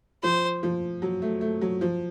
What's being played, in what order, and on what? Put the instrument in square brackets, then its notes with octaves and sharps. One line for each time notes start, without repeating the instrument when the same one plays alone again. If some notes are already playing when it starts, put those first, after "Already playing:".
[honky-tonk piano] F3 [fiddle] C5
[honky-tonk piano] F3
F#3
A3
A3
F#3
F3